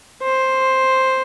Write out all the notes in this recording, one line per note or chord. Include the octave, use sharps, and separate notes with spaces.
C5